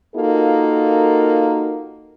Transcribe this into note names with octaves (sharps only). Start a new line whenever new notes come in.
A#3 D#4 F4 F#4 A4 A#4